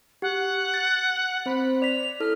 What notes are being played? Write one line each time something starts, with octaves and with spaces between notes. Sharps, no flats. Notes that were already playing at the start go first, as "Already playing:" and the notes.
G4 F#5
A6
C4 C5 B5
D5 B6 F7
E4 A4 F6